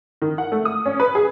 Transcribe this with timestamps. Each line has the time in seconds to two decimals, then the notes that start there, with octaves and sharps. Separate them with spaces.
0.22 D#3
0.38 F#5
0.52 A3
0.65 D#6
0.86 C#4
1.00 B4
1.15 G#4